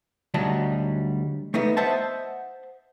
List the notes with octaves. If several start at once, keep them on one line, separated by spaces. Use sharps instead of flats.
D2 F#3 G3 D#4 A5
A3 B3 D#4
C5 D#5 E5 F#5 A5